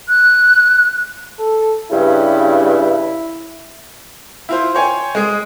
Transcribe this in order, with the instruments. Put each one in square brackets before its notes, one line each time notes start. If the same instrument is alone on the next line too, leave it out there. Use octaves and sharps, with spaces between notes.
[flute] F#6
[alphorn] A4
[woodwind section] G2 C#3 [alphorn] E4
[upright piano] E4 F4 C5
C5 C#5 G5 G#5
G#3 G#4